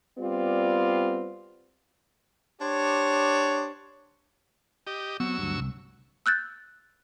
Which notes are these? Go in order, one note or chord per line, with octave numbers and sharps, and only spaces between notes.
G3 B3 C4 F4 D5
D4 G4 C5 C#5
G4 D#5
F#3 B3 C4 C#6 E6
D2 G2
C2
E6 F#6 G6 A6